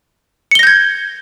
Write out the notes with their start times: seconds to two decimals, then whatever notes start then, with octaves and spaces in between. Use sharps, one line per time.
0.51 C#7
0.55 G7
0.59 A#6
0.63 G6
0.67 G#6